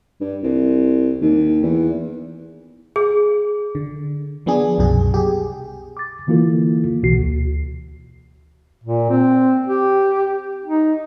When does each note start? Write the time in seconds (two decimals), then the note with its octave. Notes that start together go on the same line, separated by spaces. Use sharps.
0.20 G2
0.43 C2
1.21 D#2
1.63 E2
2.96 G#4
3.75 D3
4.46 F3 B3 D4 G#4
4.78 C2 F#2 B2 G#4
5.14 G4 G#4
5.97 D6 A6
6.27 D3 E3 A#3 E4 F4 A4
7.03 B1 B2 E3 F#4 C7
7.18 D2
8.84 A#2
9.10 C4
9.67 G4
10.64 D#4